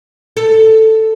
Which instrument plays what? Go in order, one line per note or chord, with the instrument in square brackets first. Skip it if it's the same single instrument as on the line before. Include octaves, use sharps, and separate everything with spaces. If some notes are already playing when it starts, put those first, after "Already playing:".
[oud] A4